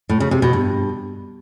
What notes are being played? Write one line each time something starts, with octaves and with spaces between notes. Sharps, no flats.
A2
C#3
C3
B2
G2